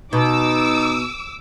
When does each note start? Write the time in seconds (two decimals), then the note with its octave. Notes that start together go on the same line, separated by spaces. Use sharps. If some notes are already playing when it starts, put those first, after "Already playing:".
0.13 B2 D#4 D6 E6